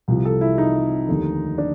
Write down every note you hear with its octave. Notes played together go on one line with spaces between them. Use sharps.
C2 C3 F3
A4
E4
D#4
F1 D#2 D3
D4